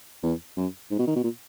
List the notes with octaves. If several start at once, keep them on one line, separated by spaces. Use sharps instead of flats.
E2
F#2
G#2
B2
D#3
B2
A#2